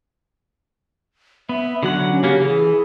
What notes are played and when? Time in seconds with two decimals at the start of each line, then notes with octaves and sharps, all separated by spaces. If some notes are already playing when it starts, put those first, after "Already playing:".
1.49 B3 E5
1.83 D3 F#3 F#4 F#5
2.11 C#4
2.23 C#3 A#3 C#4 G4
2.40 E3 G#4